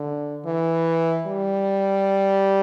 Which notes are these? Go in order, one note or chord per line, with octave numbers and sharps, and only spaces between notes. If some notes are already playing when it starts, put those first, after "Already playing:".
Already playing: D3
E3
G3